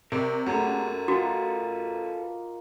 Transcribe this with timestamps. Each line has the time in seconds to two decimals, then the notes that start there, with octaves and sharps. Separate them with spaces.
0.12 C3 A#4 D5 E5 B5 C#6
0.46 F#2 F#3 A3 A#3 G4 G#4 A#4 B4
1.08 A#3 D#4 F4 F#4 A4 B4 G#5